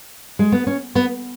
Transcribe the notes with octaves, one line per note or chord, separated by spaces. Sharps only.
G#3
B3
C#4
B3